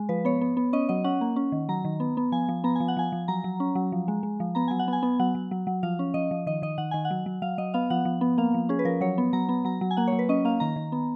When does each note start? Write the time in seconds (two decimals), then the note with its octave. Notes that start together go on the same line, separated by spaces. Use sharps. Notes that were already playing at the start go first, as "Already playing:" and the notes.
Already playing: G#3
0.09 F3 B4
0.25 B3 C#5
0.41 B3
0.57 B3
0.73 C#4 D#5
0.89 F#3 D#5
1.04 C#4 F#5
1.21 A#3
1.36 C#4
1.52 D#3
1.69 F#3 A#5
1.85 D#3
2.00 B3
2.17 B3
2.32 F3 G#5
2.49 F3
2.64 B3 A#5
2.76 F3 G#5
2.88 F#5
2.97 F3 G#5
3.12 F3
3.28 F#3 A#5
3.44 F#3
3.60 C#4
3.75 F#3
3.92 F3
4.08 G#3
4.23 G#3
4.40 F3
4.55 B3 A#5
4.68 F#3 G#5
4.79 F#5
4.88 B3 G#5
5.03 B3
5.19 F#3 F#5
5.35 F#3
5.51 F#3
5.67 F#3
5.83 F3 F5
5.99 C#4
6.14 F3 D#5
6.31 F3
6.46 D#3 D#5
6.62 D#3 D#5
6.78 D#3 F#5
6.91 D#3 G#5
7.05 F#5
7.10 F#3
7.26 F#3
7.42 F#3 F5
7.58 F#3 D#5
7.74 B3 F5
7.90 F3 F#5
8.05 F3
8.21 B3
8.38 A#3 F5
8.54 F3
8.69 C#4 G#4
8.79 B4
8.85 F3 A#4
9.01 F#3 C#5
9.18 B3
9.33 F#3 A#5
9.49 B3
9.65 F#3 A#5
9.81 F#3
9.91 G#5
9.97 A#3 F#5
10.07 C#5
10.12 F#3
10.19 B4
10.29 C#4 D#5
10.45 A#3 F5
10.60 D#3 A#5
10.76 D#3
10.92 B3